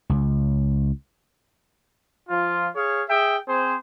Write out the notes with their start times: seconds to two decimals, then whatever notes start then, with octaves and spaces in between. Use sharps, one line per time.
0.10 C#2
2.29 F3 F4
2.75 G#4 C#5 F5
3.09 G#4 E5 G5
3.47 C4 G#4 C5